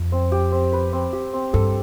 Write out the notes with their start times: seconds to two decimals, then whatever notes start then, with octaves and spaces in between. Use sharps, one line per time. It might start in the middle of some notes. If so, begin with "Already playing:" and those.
Already playing: F2
0.12 C4
0.32 G4
0.52 C4
0.72 B4
0.93 C4
1.13 G4
1.33 C4
1.53 G2 A4